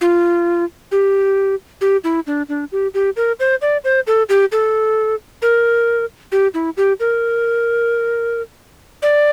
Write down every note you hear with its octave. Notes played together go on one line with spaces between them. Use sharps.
F4
G4
G4
E4
D4
D4
G4
G4
A#4
C5
D5
C5
A4
G4
A4
A#4
G4
E4
G4
A#4
D5